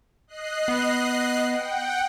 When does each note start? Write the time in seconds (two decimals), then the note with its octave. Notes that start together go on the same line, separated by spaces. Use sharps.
0.28 D#5 F#6 C7
0.68 B3
1.50 F#5 G5